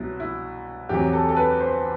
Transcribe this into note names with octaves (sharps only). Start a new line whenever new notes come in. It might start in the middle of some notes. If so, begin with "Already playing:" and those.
Already playing: C2 B2 F#3 E4
E4
E2 C3 F#3 G4
A4
A4
B4
C5